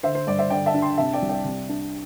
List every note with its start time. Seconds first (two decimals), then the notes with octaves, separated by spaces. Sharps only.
0.03 D3 C5 E5
0.15 C5
0.27 G2 D5
0.39 C5 E5
0.50 D3 D5 G5
0.66 E5 A5
0.74 D4
0.82 G5 C6
0.98 C3 E5 A5
1.13 D5 G5
1.22 C2
1.29 D5 G5
1.45 C3
1.69 D4